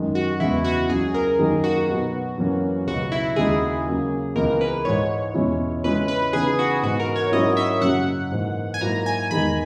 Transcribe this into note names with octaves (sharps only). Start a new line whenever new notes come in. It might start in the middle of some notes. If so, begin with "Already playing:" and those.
Already playing: F#2 D#3 G#3
F#4
E2 C#3 G#3 B3 E4
F#4
C#2 C#3 F#3 G#4
A#4
F#2 D#3 F#3 A#3
F#4
B2 F#3 B3 D#4
F#2 E3 A#3 C#4
C#2 B2 F#3 B3 F#4
E4
D#2 C#3 G#3 D#4 G#4
C#3 F#3 A#3
C#2 C#3 E3 B3 A#4
B4
G#2 E3 G#3 D#4 C#5
E2 B2 G#3 C#4 E4
C#3 G#3 C#4 E4 B4
B4
C#3 E3 B3 D#4 G#4
F#4
G#2 E3 B3 F#4
A#4
C#5
G#2 F#3 C#4 E4 D#5
E5
F#2 C#3 F#3 F#5
G#2 E3 A#3
G#5
G#2 F#3 A#3 E4 A#5
G#5
E2 D#3 G#3 B5